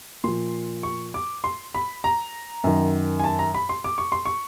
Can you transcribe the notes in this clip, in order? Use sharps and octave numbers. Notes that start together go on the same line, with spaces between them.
A#2 F3 C6
C#6
D6
C6
B5
A#5
F#2 D#3
G#5
A5
A#5
B5
C6
D6
C#6
C6
C#6